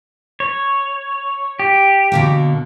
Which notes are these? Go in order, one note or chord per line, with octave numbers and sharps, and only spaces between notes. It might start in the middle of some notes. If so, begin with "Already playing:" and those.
C#5
G4
B2 D3 A#3